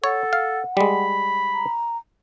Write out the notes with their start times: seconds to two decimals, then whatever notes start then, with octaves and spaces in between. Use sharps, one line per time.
0.04 A4 C#5 F#5
0.33 F5
0.77 G3 G#3 B5
1.54 A#5